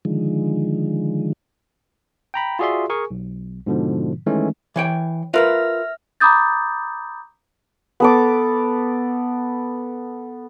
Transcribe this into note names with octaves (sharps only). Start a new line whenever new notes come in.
D3 D#3 F3 G#3
G5 A#5 B5
F4 F#4 G#4 D5 E5 C6
G#4 A#4 G#5 C#6
B1
G#2 B2 D3 F3
D#3 E3 G#3 A3 C#4
E3 C#5 G5
F4 A#4 B4 E5 F6 A#6
A#5 B5 D6 D#6 G6 A6
B3 A4 D6